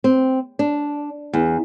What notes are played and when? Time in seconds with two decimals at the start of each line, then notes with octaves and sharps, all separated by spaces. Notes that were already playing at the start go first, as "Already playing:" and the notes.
0.04 C4
0.59 D4
1.33 E2